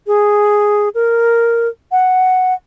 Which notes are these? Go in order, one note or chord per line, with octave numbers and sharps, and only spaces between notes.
G#4
A#4
F#5